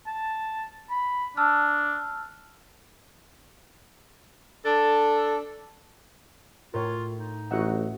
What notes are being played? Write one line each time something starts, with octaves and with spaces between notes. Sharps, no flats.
A5
B5
D4 A5 E6 F6
D4 A4
A2 F4 A#4 C#5
D#4
A1 F#4 D#5 E5 F#5